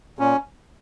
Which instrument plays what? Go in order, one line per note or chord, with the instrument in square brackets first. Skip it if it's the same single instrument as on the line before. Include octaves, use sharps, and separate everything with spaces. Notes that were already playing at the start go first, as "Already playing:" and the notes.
[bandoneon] A#2 C#4